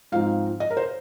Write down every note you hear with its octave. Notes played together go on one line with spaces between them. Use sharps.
G#2 F3 C4 D#4 F5
D#5
A#4
C5